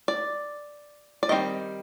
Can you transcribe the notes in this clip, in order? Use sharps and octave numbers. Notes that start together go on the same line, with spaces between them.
D5
D5
D#3 G3 C4 D#5